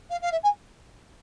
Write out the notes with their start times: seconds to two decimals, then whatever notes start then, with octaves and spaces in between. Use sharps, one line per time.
0.10 F5
0.21 F5
0.31 E5
0.43 G#5